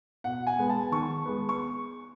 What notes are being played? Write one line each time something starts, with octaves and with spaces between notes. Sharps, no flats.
B2 F#5
G#5
G#3 B3
A5
D#3 C#6
G#3 B3
C#6